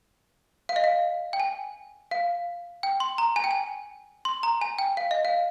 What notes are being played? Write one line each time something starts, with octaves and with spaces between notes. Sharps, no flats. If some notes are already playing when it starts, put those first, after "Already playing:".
F5
D#5
F5
G5
G#5
F5
G5
C6
A#5
G#5
G5
G#5
C6
A#5
G#5
G5
F5
D#5
F5